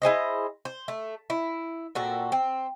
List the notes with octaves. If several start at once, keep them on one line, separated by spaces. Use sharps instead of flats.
E4 G#4 C5 D#5
C5
A3
E4
A#2 C4 F#4 A4
C4